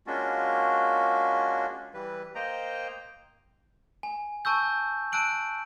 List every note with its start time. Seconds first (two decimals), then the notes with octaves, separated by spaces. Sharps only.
0.07 G#3 A#3 C#4 D4 F4 F#4
1.94 E3 G3 B4
2.35 A#3 C5 D#5 G5 A#5
4.03 G#5
4.45 G#5 A5 C#6 E6 G6
5.12 A5 E6 F#6 D7 F#7